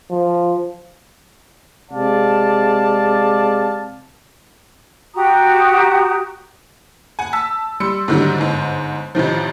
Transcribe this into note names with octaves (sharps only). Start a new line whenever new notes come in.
F3
C3 G#3 D5 F5 A5
F#4 G4 A#5 D#6
F#5 G#5
A5 E6 B6
G3 C6 E6 C#7
G#2 D3 D#3 F#3 G3
G1 G#2
A1 C3 D#3 F3